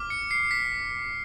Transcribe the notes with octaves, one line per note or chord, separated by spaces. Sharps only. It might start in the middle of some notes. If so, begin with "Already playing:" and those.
Already playing: D6 F6
C#7
C7
B6